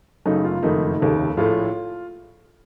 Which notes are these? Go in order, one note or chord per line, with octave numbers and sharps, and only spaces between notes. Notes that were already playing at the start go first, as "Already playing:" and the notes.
F#1 F#2 C#3 A3 D#4
F4
F#1 F2 D#3 A3 D#4
F1 D#2 C#3 A3
A#1 A2 A3 F4